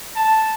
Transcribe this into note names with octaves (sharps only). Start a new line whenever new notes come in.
A5